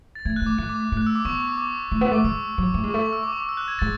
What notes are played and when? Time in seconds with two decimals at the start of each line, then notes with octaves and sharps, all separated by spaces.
0.15 A6
0.25 A3 G#6
0.36 F#6
0.42 A3 D6
0.58 A3 F#6
0.69 D6
0.80 D6
0.92 A3
0.97 F#6
1.06 E6
1.15 D6
1.25 B3 C#6
1.35 C#6
1.47 D6
1.57 D6
1.92 A3
2.01 B3
2.11 A3 D6
2.24 G#3 E6
2.58 F#3
2.74 A3
2.84 G#3
2.90 C#6
2.94 A3
3.01 C#6
3.12 E6
3.23 D6
3.33 C#6
3.40 D6
3.49 E6
3.57 F#6
3.68 G#6
3.79 G#3 A6